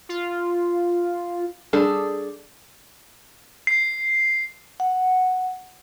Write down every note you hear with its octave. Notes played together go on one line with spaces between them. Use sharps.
F4
G3 D4 G#4 A4
C7
F#5